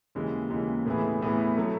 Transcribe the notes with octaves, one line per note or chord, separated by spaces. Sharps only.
D#2 C#3 E3 G#3
D#2 C#3 E3 G#3
A2 E3 B3 E4 G#4
A2 E3 B3 E4 G#4
B2 F#3 A3